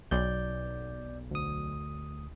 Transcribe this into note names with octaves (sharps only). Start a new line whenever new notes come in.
B1 D5 G6
D2 D#6